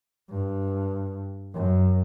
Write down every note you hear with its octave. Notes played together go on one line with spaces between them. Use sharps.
G2
F#2